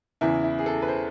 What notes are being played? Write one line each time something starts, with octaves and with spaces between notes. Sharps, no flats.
E2 C#3 E3 E4
E4
G#4
A4
B4
C5